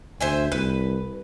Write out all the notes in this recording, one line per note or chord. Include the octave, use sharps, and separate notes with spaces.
D2 C5 E5 G#5
C2 B4